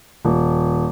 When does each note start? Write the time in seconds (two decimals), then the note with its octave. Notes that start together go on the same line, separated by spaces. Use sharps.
0.25 D#1